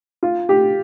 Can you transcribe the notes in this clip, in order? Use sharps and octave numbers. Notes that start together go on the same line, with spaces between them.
F4
G4